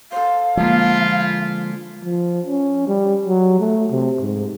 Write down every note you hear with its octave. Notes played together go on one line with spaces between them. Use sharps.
A4 C5 F5
D3 F3 G#3 A#3 E4 F4
F3
C#4
G3
F#3
A3
C3
G#2